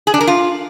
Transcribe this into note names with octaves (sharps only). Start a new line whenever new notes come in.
G#4
D4
A#4
F4